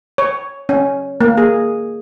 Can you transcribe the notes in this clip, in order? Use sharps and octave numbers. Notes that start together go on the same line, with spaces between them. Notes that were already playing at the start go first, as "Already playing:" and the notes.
C#5
C#4
A#3
G#4